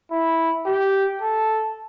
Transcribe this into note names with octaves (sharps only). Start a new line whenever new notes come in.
E4
G4
A4